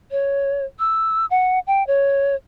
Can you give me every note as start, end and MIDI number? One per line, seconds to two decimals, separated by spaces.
0.11 0.65 73
0.79 1.26 88
1.31 1.59 78
1.67 1.86 79
1.87 2.36 73